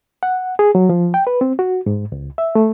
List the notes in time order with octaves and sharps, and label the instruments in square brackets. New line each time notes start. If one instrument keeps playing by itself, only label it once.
[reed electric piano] F#5
G#4
F#3
F3
G5
B4
C4
F#4
G#2
C#2
E5
A3